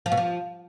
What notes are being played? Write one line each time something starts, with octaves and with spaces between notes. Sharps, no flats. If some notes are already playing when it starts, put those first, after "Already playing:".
F3
B2
F3